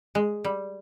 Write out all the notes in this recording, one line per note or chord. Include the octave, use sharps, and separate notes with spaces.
G#3
G3